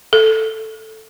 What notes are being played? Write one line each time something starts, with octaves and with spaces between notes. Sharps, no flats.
A4